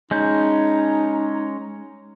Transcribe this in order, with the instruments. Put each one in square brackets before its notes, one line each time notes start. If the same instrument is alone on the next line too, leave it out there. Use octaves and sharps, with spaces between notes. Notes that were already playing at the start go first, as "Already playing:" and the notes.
[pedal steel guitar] G#3 C#4 G6 [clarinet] D#4